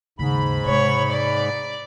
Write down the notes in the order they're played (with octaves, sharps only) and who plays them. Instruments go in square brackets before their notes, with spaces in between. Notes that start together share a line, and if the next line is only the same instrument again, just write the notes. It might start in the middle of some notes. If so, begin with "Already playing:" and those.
[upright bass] D#2 C#3 [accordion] G#2 B5
[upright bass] C3 G#3 [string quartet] C#5
[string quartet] D5